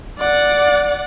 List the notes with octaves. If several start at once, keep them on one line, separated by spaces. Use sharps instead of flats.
D5 F#5